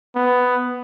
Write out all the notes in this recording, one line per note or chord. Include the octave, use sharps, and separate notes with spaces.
B3